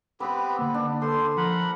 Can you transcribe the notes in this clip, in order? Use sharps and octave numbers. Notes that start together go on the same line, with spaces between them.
B3 C4 G4 B4 C6
D3 A#3 B3
D4
A4 C5 C6
F3 A#4 F#5 B5